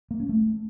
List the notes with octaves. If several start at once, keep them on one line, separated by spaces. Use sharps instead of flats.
A#3
C#4
A3